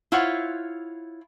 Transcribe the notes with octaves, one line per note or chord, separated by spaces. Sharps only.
E4 F4 C5 C#5 F#5